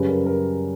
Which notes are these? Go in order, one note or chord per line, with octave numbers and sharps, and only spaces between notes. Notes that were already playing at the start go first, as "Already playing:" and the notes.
Already playing: F#2 C#3 G3 B4
A#4
A#4